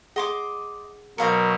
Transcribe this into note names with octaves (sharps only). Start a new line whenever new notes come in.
G#4 D#5 F#5 C6 D6
B2 F#3 A#4 C5 F5 C#6